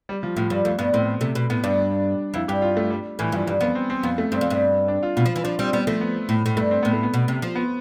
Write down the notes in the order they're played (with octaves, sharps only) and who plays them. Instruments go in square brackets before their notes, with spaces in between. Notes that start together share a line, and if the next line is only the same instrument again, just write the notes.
[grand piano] G3
F3
[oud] A2 [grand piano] F3
[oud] G2 [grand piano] G3
[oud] F2 [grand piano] A3
[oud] G2 [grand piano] B3
[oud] A2 [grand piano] C4
[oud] C3 [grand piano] A3
[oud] B2
[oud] A2 [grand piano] B3
[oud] G2 [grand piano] D4
[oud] F2 [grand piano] E4
[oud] G2 [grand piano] G4
[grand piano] F4
A3
G3
[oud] A2 [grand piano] E3
[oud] G2 [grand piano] F3
[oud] G2 [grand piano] G3
[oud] F2 [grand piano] B3
[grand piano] C4
C4
[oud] F2 [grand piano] B3
[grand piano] A3
[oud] G2 [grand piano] C4
[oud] F2
G2
[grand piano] D4
F4
[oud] B2 [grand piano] F4
[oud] F3
E3
[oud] F3 [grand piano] D4
[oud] G3 [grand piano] C4
[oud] G3 [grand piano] B3
[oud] F3 [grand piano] A3
[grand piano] B3
[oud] A2
A2
[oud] G2 [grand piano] A3
[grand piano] C4
[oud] A2 [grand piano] B3
[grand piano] A3
B3
[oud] B2
C3
F3
[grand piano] B3